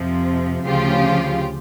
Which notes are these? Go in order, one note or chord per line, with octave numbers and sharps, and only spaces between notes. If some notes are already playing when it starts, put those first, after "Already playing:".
Already playing: F2 C3 F3
D2 C#3 F3 F4 G4